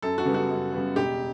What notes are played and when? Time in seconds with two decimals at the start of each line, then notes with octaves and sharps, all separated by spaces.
0.02 F#2 A4
0.18 F#4
0.25 C#3 G3 B3
0.34 F#4
0.49 F#2
0.73 C#3 G3 B3
0.96 E1 G4